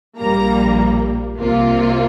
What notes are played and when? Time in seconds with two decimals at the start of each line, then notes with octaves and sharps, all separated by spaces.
0.18 A#1 A#2 G3 A#3 A#5
1.35 C2 C3 A#3 F4